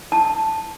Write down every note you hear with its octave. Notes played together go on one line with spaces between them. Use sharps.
E4 A5